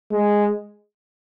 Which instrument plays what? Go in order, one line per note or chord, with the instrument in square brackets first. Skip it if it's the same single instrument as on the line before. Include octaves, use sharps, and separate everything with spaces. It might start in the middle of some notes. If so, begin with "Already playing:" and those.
[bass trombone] G#3